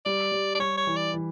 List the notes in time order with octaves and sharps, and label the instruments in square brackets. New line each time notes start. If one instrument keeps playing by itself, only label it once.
[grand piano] G3 [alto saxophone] D5
[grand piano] G3
[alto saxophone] D5
[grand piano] G3 [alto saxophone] C#5
[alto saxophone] C#5
[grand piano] E3
[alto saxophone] D5
[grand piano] E3